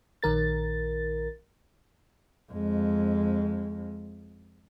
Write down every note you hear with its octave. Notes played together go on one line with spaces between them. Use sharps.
A#1 D#3 A#4 A6
F2 G#3